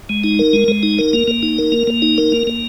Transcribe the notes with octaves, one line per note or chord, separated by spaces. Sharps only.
G#3
D#4
A#4
G#3
G#3
D#4
A#4
A#3
A#3
D#4
A#4
A#3
A#3
D#4
A#4
A#3
A#3